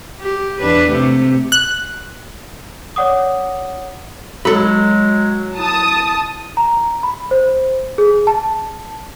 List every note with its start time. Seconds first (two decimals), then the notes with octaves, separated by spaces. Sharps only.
0.21 G4
0.61 E2 D4 B4
0.92 C3 A3 G4
1.52 F#6
2.96 C#5 D5 F#5 D6 D#6
4.45 F#3 G#3 A4 B5
5.57 E4 A5 D#6
6.57 A#5
7.03 B5
7.31 C5
7.98 G#4
8.27 A5